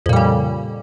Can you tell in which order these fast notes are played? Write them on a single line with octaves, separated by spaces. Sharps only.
F2 A#2 G3 C#3